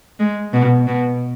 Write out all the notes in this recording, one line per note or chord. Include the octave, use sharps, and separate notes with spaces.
G#3
B2
B2